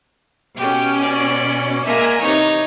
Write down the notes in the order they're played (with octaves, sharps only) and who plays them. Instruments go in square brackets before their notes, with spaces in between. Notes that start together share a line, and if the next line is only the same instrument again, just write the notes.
[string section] B2 C#4 [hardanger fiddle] G4
[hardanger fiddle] D5
[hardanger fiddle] G#3 A#3 [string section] E5 G#5 A#5
[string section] C3 E3 [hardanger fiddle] D#4 C#5